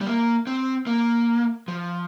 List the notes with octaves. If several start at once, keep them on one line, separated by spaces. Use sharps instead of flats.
G3
A#3
C4
A#3
F3